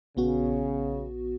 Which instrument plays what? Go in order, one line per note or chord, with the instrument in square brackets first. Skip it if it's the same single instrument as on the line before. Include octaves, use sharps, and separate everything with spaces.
[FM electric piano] A#1 B3 F#4 [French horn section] C#3